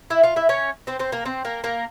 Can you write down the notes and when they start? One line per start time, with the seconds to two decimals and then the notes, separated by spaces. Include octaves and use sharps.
0.10 E4 E5
0.23 F4 F5
0.36 E4 E5
0.49 C#4 C#5
0.87 C4 C5
0.99 C4 C5
1.12 A#3 A#4
1.25 C4 C5
1.45 A#3 A#4
1.64 A#3 A#4